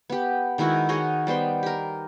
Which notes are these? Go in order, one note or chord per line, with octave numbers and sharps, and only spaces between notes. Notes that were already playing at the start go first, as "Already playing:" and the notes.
B3 G4
D#3 G#3 E4 F#4
F#4 G#4 C#5 D#5
G3 B3 C5 G5
G4 A#4